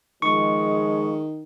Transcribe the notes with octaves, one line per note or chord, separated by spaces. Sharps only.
D#3 F3 G#3 C#6